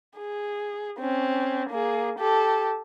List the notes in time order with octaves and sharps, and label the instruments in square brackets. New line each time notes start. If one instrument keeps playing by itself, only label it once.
[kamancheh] G#4
C4 C#4
A#3 G#4
G4 A4